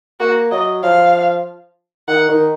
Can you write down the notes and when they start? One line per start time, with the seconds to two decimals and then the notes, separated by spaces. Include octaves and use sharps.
0.20 A#3 F#4
0.51 F#3 D#5
0.83 F3 F5
2.08 D#3 F#5
2.29 D#3